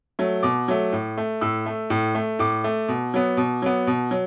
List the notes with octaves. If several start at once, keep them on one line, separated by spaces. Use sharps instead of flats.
F#3 A3
B2 D6
F#3 A3
A2
A3
A2 E6
A3
A2
A3
A2 D6
A3
B2
F#3 B3
B2
F#3 B3
B2
F#3